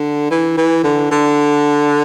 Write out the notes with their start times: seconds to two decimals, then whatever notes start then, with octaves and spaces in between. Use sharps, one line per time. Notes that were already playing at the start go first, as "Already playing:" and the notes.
Already playing: D3
0.31 E3
0.57 E3
0.84 D3
1.11 D3